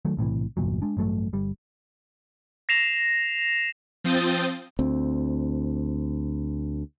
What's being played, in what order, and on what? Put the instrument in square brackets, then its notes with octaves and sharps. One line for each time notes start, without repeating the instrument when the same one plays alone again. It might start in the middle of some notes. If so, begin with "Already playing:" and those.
[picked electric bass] D#3 F#3 A3
B1 A2 C3 E3
G1 E2 A#2 F#3
G#3 D4
A1 G2 F#3 A3
G1 G3
[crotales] A#6 C7 E7 F7
[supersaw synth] F3 C4 D#6 G6 A6
[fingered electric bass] D2 C4